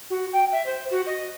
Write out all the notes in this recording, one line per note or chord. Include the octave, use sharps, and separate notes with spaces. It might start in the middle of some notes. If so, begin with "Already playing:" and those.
F#4
G5
E5
C5
F#4
D#5